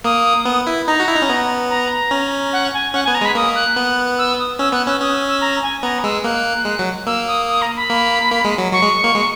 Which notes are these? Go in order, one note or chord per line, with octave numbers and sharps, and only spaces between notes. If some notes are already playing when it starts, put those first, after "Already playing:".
A#3 D#6
B3
E4
D#4 A#5
F#4
E4
D#4
C#4
B3
A#5
C#4
F#5
G#5
C#4 F#5
G#5
B3
A#5
G#3 B5
A#3 D#6
F#6
B3
E6
D#6
C#4 E6
B3 F#6
C#4 E6
C#4 D#6
E6
E6
A#5
G#5
B3 A#5
D#6
G#3 E6
A#3 F#6
G#3
F#3
A#3 E6
D#6
D#6
A#5
B5
A#3
A#3
G#3
F#3
F#3 C#6
G#3
A#3
G#3